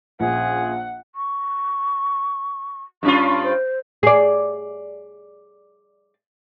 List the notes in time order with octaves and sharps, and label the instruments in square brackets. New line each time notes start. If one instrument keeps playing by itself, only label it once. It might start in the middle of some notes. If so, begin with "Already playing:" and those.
[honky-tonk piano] A#1 [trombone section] C#4 F4 G#4 [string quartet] F#5
[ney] C#6
[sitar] G2 C#4 F4 [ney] C#6
[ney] C5
[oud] G#4 D5